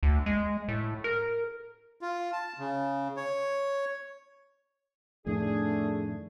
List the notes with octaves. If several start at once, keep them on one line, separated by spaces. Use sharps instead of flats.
D2
G#3
A2
A#4
F4
A5
C#3
C#5
F2 A2 D#3 A3 D4 G#4